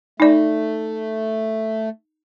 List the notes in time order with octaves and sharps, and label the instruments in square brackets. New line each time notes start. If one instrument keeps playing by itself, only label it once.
[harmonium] A3 [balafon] D#4 D5